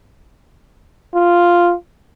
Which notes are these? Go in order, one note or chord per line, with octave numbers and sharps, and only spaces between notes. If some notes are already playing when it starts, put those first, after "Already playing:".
F4